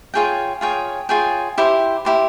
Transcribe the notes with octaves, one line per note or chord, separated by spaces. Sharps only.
F4 G#4 C#5 G5
F4 G#4 C#5 G5
F4 G#4 C#5 G5
E4 G4 C5
E4 G4 C5